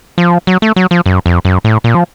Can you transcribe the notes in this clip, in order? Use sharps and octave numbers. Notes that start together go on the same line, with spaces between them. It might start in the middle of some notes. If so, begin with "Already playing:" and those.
F3
F#3
A3
F#3
F3
F#2
F2
F#2
A2
A#2
F3